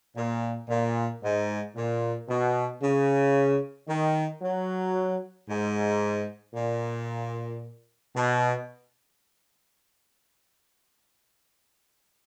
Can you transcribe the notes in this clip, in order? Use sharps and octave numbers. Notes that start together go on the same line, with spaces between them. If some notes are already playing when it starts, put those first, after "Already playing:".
A#2
A#2
G#2
A#2
B2
C#3
D#3
F#3
G#2
A#2
B2